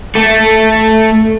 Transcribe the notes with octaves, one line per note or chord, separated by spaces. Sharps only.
A3